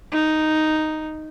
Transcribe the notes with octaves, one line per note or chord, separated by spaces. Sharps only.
D#4